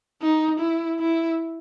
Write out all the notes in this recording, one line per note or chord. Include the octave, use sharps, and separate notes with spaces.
D#4
E4
E4